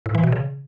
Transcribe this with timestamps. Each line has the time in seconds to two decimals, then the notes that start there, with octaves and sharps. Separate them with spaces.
0.06 A2
0.15 E3
0.24 B2
0.32 C#3